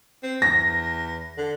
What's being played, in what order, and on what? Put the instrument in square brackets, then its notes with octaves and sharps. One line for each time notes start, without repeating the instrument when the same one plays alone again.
[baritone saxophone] C4
[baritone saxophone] E2 [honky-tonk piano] A#6
[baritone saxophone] D3